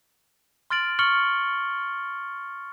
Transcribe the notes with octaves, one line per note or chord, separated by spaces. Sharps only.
C6 F6 A6 D7 F#7
C#6 F6 C#7 F#7 G7